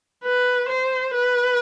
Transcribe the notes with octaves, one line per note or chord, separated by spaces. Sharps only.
B4
C5
B4